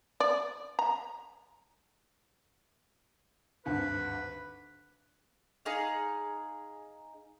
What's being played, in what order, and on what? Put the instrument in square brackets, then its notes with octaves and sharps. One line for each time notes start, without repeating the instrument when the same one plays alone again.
[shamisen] D5
A#5
[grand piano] G#1 D2 G2 [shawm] B4
[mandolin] D#4 G#4 F5